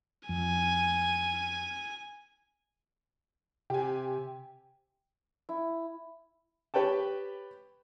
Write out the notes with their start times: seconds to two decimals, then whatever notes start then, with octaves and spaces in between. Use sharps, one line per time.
0.29 F2 G#5
3.70 C3 G4 G5 G#5
5.49 E4
6.74 G4 B4 C#5 G5 A5